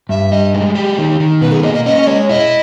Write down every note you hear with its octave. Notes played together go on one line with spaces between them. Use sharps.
G2 E5
G3 D#5
G#3
G4
D#3
D#3
B2 B4
G#4
A#3 D#5
D#5
C#4 D#5
G#3 C#5
E4 D#5